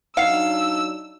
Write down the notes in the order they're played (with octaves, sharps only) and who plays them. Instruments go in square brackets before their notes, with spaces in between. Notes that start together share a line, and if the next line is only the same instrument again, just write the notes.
[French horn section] F#3 D4 D#4 [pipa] F5 [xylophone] F#5 C7 [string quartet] E6